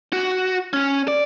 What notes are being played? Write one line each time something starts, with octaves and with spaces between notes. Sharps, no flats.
F#4
C#4
D5